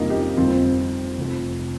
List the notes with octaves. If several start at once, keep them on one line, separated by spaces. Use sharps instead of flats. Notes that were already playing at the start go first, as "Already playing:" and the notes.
Already playing: F2 C3 G3 A#3 C4 D#4 F4
D#4 G4
G1 F2 D#3 G3 C4 F4
F1 F2 F3